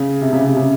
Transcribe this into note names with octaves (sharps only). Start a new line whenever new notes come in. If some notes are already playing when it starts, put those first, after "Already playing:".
Already playing: C#3
C3
C#3
C3
C#3